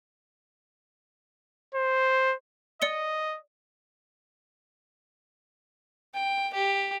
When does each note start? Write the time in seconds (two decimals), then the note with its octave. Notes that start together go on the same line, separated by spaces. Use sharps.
1.75 C5
2.82 D5 D#5 C#7 G7
6.14 G5
6.54 G4